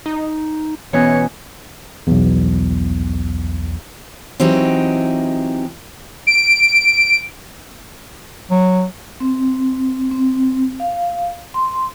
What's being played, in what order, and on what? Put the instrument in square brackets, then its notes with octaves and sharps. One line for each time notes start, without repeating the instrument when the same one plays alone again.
[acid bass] D#4
[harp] B2 C#4 G#5 [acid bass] E3 [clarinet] C#5
[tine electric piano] B1 E2
[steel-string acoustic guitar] E3 F#3 C4 D#4 G4
[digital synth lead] D7
[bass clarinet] F#3
[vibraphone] C4
C4
F5
C6